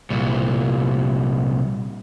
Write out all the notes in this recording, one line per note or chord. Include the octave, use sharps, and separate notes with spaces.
C2 A#2